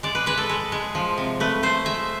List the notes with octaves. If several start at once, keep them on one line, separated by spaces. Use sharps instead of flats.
G#3 D5
B4
G#3 B4
A4
G#3
G#3
F3
C3
A3 B4
A3 C5
G#3 E5